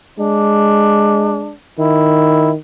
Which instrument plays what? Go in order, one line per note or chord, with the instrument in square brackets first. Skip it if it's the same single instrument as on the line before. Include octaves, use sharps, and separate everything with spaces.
[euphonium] G#3 [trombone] D4
[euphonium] D#3 [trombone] E4